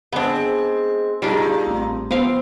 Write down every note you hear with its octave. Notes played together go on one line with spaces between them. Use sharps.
G#3 B3 C4 D4
A#2 G3 A#3 D4 D#4 F4 G#4
A1 C4
F3 B3 C4 F5